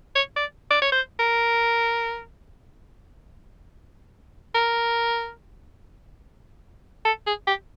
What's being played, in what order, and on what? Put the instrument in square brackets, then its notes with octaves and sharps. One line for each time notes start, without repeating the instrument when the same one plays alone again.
[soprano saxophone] C#5
D5
D5
C#5
C5
A#4
A#4
A4
G#4
G4